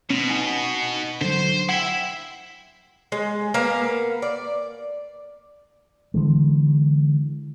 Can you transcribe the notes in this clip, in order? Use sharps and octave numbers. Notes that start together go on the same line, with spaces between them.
B2 C4 C#4
D#4 F#5 G#5
D3 F#3 C5
E4 E5 F#5 G5
G#3
A#3 B3 F5
D5
D3 E3 G#3